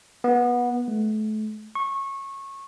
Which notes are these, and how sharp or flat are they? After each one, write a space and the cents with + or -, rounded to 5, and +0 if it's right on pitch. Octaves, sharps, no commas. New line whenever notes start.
B3 -20
A3 -35
C#6 -20